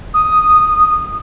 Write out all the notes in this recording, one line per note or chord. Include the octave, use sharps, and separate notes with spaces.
D#6